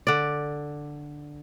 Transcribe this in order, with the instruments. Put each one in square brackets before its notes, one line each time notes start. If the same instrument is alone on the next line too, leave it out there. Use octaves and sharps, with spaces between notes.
[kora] D3 D5